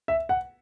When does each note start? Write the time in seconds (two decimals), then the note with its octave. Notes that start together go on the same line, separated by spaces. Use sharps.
0.08 E5
0.29 F#5